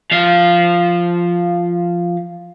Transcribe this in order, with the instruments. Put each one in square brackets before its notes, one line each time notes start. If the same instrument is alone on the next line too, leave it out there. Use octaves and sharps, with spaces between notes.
[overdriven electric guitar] F3 F5